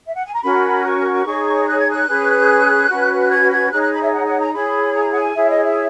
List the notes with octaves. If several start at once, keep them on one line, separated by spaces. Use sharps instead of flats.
E5
F#5
G#5
A#5
C#4 F#4 A#4 B5
C#6
D#4 G#4 C#5
F#6
G#6
F#6
C#4 G#4 B4
C#4 F#4 B4
G#6
G#6
D#4 G#4 C#5 F#6
F#6
B5
E5
F#5
F#5
A#5
E4 G#4 C#5 B5
A#5
F#5
G#5
E4 G#4 C#5 E5
D#5
E5